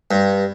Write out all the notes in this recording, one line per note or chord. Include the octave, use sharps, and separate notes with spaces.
G2